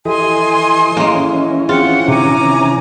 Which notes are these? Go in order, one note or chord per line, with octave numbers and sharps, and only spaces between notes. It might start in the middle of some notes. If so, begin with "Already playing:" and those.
E3 G4 A4 D#5 G#5 C6
E3 G#3 A#3 C#4
C4 F4 G#4 F#5
C3 D#3 G#5 A#5 D6